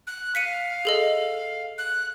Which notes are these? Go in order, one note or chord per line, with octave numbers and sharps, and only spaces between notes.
F#6
F5 B6 C#7 D#7
G#4 A4 D#5
F#6